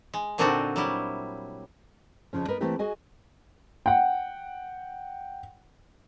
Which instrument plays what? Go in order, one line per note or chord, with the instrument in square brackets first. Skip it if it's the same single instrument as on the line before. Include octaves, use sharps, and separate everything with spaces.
[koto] G#3
A#2 D3 C4 D4 D#4 F#4
F#3 G3 E4
[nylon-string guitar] F2 C#3 F3 C#4
B3 D#4 A#4 B4
E3 A3 A#3 C4 E4 G4
F#4 G#4 D#5 G#5
[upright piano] F#5 G5